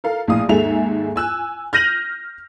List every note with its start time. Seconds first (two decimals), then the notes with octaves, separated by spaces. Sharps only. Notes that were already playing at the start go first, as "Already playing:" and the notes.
0.04 A4 A#4 F5
0.28 A#1 A2 F5 D#6
0.49 D#2 G#2 G#4 A4 E5 F7
1.16 G#5 E6 F#6
1.73 F6 G6 A#6 D#7 F7 F#7